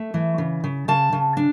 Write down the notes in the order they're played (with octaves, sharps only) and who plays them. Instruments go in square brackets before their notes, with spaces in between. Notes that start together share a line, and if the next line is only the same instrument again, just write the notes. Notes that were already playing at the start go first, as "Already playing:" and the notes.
Already playing: [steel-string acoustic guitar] A3
E3
C#3
C#3
C#3 A5
C#3
D4